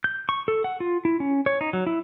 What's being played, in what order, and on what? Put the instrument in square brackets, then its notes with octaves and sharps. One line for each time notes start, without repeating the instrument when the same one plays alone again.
[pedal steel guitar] G6
C#6
A4
F#5
F4
E4
C#4
C#5
D#4
F#3
E4